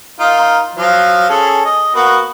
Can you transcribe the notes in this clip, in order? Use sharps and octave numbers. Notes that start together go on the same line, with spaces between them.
D#4 F4 A#4
F3 F#3 F5
C#4 G#4 A4
D#5
A#3 B3 F#4